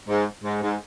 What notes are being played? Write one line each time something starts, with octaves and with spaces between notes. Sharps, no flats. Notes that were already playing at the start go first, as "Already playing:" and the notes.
G#2
G#2
G#2